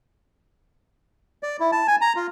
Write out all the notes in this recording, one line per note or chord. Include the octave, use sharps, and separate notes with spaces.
D5
E4
A5
G#5
A#5
F4